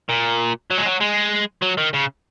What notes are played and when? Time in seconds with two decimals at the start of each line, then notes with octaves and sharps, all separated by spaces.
0.09 A#2
0.71 F#3
0.78 G#3
0.86 F#3
1.01 G#3
1.62 F#3
1.78 D#3
1.94 C#3